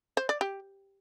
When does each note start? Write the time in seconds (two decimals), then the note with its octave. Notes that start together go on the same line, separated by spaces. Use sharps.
0.17 C5
0.29 D5
0.41 G4